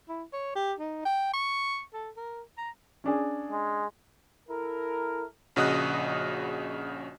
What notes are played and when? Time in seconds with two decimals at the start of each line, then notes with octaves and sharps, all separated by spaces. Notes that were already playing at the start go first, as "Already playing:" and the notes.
0.08 E4
0.33 C#5
0.55 G4
0.78 D#4
1.05 G5
1.33 C#6
1.93 A4
2.16 A#4
2.57 A#5
3.04 C#4 D4 G#4
3.51 G#3
4.49 E4 A4 A#4
5.56 A#1 C#3 F#4 D#5 D#6 F#6